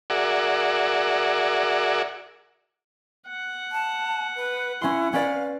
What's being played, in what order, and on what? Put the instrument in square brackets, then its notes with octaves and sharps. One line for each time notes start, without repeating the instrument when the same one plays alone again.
[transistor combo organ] F#4 G#4 A#4 D5 E5 F#5
[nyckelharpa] F#5
[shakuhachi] A5
B4
[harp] C#4 C6 [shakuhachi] E4
[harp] C#4 B4 D5 [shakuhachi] F5